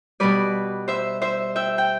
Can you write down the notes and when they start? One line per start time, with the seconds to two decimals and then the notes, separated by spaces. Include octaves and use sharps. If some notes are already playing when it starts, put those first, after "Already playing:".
0.20 B2 G3 B4 D5
0.88 C5 E5
1.22 C5 E5
1.56 E5 G5
1.78 G5